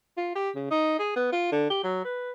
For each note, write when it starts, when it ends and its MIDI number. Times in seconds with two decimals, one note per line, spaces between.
0.17 0.35 65
0.35 0.50 67
0.55 0.67 49
0.71 0.98 63
0.99 1.14 68
1.16 1.28 59
1.32 1.47 65
1.52 1.66 50
1.70 1.80 67
1.84 2.03 54
2.04 2.32 71